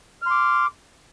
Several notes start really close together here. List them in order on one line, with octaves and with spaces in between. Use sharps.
F6 C6 D6